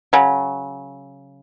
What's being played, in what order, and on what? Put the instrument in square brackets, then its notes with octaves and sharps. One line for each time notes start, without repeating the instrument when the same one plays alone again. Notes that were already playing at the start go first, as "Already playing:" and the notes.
[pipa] C#3 F#3